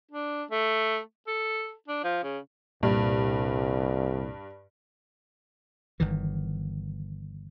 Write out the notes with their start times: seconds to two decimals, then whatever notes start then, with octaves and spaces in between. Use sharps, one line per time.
0.11 D4
0.51 A3
1.28 A4
1.88 D4
2.04 F3
2.23 C#3
2.83 C2 G2 A#2
6.00 G1 D#3 E3